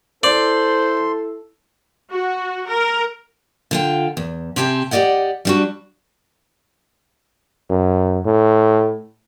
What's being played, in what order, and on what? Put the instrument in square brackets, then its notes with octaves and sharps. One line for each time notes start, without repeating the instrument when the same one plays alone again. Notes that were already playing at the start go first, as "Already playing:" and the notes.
[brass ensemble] E4 A4 [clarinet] C5 [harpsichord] D5 [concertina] C6
[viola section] F#4
A#4
[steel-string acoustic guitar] D3 F4 G5
E2
C3 C4 G4 G#4 A5
G4 A#4 D5 D#5 F#5
G3 D4 F#4
[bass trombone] F#2
A2